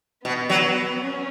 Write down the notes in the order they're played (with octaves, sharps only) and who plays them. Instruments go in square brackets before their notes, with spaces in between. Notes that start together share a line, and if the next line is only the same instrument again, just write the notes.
[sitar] B2 [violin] B3
[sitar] F#3
[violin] C#4